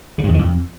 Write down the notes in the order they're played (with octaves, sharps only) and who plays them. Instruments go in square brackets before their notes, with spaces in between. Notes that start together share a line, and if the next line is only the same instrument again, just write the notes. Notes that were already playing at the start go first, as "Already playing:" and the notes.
[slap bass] C#3
G2
E2
D#3
F2